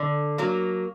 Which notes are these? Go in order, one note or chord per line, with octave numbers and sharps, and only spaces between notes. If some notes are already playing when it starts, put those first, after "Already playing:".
Already playing: D3
F#3 A#3